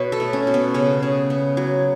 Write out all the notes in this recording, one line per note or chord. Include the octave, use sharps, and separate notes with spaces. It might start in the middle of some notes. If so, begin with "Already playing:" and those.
Already playing: B2 B4 C#5
A4
A3
C#4
B2
B3
C#3 C#4
C#3
B3
F#3